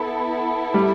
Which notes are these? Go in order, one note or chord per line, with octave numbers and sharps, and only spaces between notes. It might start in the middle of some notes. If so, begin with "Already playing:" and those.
Already playing: B3 E4 A4
G3